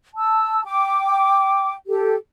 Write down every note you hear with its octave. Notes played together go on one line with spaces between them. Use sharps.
A5 E6
G5 D6
G4 A4